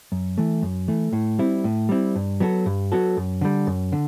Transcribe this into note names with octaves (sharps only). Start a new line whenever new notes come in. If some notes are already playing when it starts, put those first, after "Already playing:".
F#2
E3 A3
F#2
E3 A3
A2
G3 C4 E4
A2
G3 C4 E4
G2
F#3 B3 F#4 A4
G2
F#3 B3 F#4 A4
F#2
D3 G3
F#2
D3